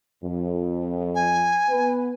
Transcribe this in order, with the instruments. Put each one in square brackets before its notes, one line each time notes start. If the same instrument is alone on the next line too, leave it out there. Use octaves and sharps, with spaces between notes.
[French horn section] F2
[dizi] G#5
[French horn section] B3 B4